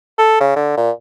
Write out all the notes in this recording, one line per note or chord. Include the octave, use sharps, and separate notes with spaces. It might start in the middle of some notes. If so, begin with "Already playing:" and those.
A4
C#3
D3
A#2